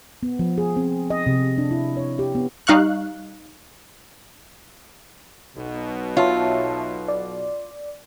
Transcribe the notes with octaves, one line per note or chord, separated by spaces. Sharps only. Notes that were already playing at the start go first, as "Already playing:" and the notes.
B3
F3
G#4
C4
D#5
C3
D4
E4
C#5
G4
B3
G3 D#4 F5 C#6 F#6
B1 B2
F4 C#5 E5 A5
D5